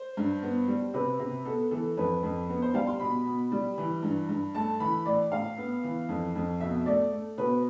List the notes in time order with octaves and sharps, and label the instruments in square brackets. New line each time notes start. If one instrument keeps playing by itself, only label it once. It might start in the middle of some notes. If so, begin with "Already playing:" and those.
Already playing: [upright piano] C5
G2
B3
G3
C3 B4
C3
B3 A4
E3 A4
F2 B4
F2
B3
C5
G3 F5
C6
B2 B5
B2
G3
E3
G2
G2
A3 A5
E3 B5
A2 D5
A2 F5
B3
E3
F2
F2
B2 E5
A3 D5
A3
B2 B4